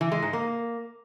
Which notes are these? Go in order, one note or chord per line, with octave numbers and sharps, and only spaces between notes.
E3
G#3
G#2
A#3